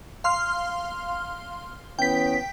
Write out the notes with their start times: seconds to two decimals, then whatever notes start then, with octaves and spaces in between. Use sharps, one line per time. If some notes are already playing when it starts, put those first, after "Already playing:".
0.24 F5 C6 F6
1.99 E3 B3 C#4 G5 B6